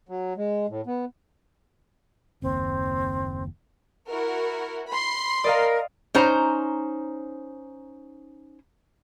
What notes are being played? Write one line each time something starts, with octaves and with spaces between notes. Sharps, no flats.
F#3
G#3
A2
B3
F#1 D#2 C4
E4 F#4 A#4
B5 C6
A#4 D5 D#5 F5
C#4 D#4 C5 A#5